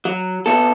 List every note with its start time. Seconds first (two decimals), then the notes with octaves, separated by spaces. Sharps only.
0.05 F#3
0.46 B3 F#4 A4